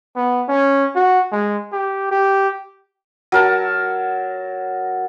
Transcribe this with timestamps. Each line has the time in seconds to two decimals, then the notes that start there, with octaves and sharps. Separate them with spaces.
0.16 B3
0.48 C#4
0.95 F#4
1.32 G#3
1.72 G4
2.11 G4
3.32 F#3 A#4 A5